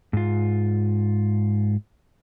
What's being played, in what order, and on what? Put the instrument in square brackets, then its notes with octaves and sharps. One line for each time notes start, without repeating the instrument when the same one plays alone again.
[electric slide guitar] G#2 F4